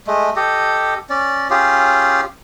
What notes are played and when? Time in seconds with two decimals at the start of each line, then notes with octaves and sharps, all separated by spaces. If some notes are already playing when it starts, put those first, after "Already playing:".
0.07 G#3 A3
0.36 G4 A4 D#5
1.10 C#4 D5
1.50 C#4 F4 G4 G#4